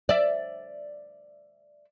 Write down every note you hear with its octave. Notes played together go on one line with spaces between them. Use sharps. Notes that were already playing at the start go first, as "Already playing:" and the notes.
D5 E5